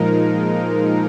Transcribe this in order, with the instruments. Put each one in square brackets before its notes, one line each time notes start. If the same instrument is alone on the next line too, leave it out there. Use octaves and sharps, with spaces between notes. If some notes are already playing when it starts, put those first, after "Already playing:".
Already playing: [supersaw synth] A#2 F3 G#3 D#4 A#4